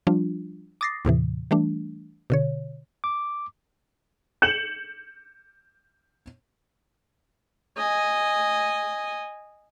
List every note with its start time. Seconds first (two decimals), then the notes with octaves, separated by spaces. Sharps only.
0.07 F3 G3 D4 F4
0.81 D6 D#6 A6 A#6 C7
1.05 D#2 A2 C3 E3
1.51 E3 G3 A3 D4
2.30 B2 D3 C#5
3.04 D6
4.42 G6 C#7 E7 F#7
7.78 D#5 G#5